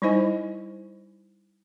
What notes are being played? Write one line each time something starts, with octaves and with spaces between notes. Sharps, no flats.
G3 D#4 E4 C5 D#5 G#5